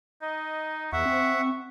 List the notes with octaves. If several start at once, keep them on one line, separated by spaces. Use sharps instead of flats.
D#4 D#5
E2 E5 F#5 C#6
C4